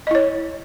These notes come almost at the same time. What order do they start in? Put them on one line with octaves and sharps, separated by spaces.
D#5 E4 C#5